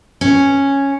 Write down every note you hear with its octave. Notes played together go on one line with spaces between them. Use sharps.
C#4